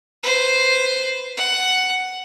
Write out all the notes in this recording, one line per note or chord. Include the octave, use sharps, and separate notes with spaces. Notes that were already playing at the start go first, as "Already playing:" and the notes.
B4 C5
F#5